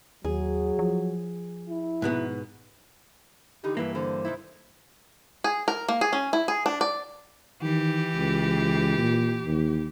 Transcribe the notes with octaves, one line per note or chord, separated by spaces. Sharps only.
D#2 F#3 G#4
F3
E4
G#2 B2 B3
D3 E3 D#4 G4
G2 E3 A#3 B4 E5
D3 C5
C3 D#4 E4
G#4
A#4
A#3
G#4
C#4
E4
G#4
D4
D5
D#3 E3 G4
C#2
A#2
D#2